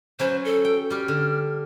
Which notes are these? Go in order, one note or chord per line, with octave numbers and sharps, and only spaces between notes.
F#3 C#4 B4 C5
A4
G5
G3 G4 F6
D3